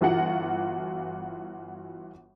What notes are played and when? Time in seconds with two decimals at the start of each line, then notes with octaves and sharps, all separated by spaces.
0.01 G1 E3 F4 F#4 F#5 C#7